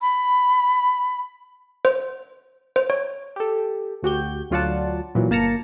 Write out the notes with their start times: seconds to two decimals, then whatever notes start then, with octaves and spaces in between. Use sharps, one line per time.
0.02 B5
1.85 C5
2.76 C5
2.90 C#5
3.36 G4 A4
4.03 D2 F#4 G4 G6
4.51 D2 F#3 F4 D5 F#5 A5
5.15 A#2 E3 F#3
5.30 G1 A#3 A5 A#5 C#7